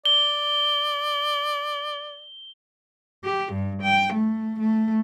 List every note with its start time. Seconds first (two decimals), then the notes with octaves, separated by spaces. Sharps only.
0.05 D5 G7
3.24 G4
3.53 G2
3.83 G5
4.14 A3
4.60 A3